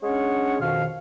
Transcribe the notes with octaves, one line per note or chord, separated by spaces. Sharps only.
G#3 C#4 D4 C#5 F#5
F2 B2 D#3 F5